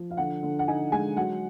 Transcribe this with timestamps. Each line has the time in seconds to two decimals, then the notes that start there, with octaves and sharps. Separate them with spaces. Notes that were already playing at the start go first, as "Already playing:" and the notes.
Already playing: F3
0.11 F5
0.17 D3 F#5
0.43 D3
0.59 F#5
0.68 D#4 G#5
0.92 G#3 G#5
1.17 F#3 F#5